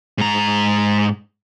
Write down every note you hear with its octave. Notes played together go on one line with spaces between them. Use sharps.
G#2 A#5